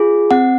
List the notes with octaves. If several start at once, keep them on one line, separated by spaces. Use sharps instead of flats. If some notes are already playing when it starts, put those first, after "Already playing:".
Already playing: F4 G#4
C4 F#5